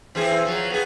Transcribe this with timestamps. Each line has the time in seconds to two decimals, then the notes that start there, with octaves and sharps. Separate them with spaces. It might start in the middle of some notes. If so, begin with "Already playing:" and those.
0.15 E3 C4 G#4
0.45 F3 F#3
0.70 B3 G#4